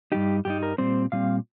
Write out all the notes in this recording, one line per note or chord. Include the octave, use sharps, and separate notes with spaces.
G2 G3 D#4 G4
G2 G3 D#4 G4
A#4
A#2 G3 C4 C5
A#2 G3 C4 F5